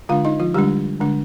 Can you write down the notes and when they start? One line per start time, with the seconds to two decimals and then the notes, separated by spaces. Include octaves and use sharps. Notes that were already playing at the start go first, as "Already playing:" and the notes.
0.09 D3 G#3 D4 F4 F5
0.25 D#4 D#5
0.40 F3 F4
0.54 D3 G3 G#3 D4 G4
1.01 D3 G#3 D4